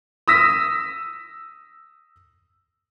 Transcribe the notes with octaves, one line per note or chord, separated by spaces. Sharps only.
D#6 E6 A#6 B6